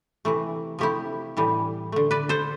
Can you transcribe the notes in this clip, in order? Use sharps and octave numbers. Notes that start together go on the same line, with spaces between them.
C3 E3 A3
C3 F3 A3 E4 G4
A2 E3 G3
D3 A3
B4 D5
A4 C5